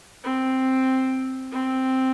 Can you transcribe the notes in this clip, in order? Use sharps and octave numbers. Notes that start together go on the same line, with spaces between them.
C4
C4